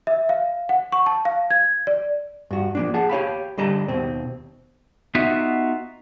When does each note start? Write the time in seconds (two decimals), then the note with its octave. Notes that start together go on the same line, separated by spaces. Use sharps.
0.07 E5
0.29 F5
0.69 F#5
0.92 C#6
1.06 A5
1.25 F5
1.50 G#6
1.87 D5
2.51 G2 F#4
2.75 F3 A#3 D4
2.94 G#4 F#5 A5
3.10 G4 C#5 F5 B5
3.58 D3 G3 D#5 A5 A#5
3.88 D#2 B2 C4
5.15 B3 D#4 F4 F#4 E5